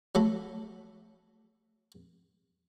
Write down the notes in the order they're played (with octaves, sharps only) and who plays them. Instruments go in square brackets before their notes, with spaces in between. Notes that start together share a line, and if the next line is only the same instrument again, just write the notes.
[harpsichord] F#3 A3 A4 B5